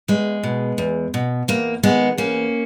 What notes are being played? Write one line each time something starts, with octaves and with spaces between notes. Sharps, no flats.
E2 G#3
B2
E2
B2
E2 A#3
D#3 G#3 B3
E2 A#3 C#4